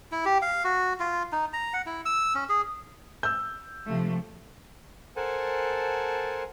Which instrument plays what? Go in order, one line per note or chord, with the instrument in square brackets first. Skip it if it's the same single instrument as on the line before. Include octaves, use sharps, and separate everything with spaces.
[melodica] E4
G4
F5
F#4
F4
D#4
A#5
F#5
E4
E6
C#4
G#4
[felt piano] E6 G6
[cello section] C3 F3 A3
[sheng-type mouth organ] A4 A#4 C5 F#5 G#5 A5